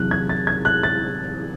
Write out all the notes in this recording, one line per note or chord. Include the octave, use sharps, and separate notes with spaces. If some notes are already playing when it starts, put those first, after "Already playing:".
Already playing: E2 C3 F#3 F#6
G#6
A6
G#6
F#6
A6